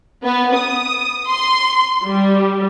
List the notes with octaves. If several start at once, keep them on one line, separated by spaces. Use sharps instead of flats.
B3
D#6
C6
G3